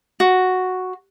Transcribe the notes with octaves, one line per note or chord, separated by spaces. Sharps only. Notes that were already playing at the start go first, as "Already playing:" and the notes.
F#4